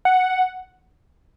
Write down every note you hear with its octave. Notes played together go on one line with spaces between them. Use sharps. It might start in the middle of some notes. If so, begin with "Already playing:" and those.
F#5